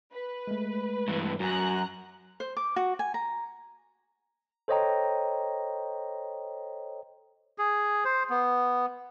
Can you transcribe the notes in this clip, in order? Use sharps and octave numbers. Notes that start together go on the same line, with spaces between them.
B4
G#3 A3
G2 E3
F#2 F#4 G#5 A#5 F#6
C5
D6
F#4
G#5
A#5
A4 C5 C#5 D#5 G5 A#5
G#4
C5
B3